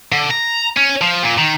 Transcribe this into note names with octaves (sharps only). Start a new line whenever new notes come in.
D3
A#5
C#4
F3
A#2
D#3